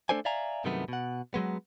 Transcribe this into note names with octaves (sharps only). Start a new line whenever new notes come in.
A3 D4 A4 C5 D5 G#5
D5 E5 F5 G#5 A#5
G2 C3 D#3 F#3 A3 B3
B2 F#5
F#3 G#3 B3